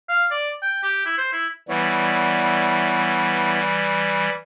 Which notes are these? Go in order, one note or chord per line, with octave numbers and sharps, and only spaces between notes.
F5
D5
G5
G4
E4
C5
E4
E3 G3 B3 E4 C#5